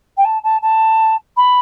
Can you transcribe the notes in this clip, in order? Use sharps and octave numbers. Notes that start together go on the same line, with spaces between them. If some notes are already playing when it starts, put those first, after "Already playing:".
G5
A5
A5
A5
B5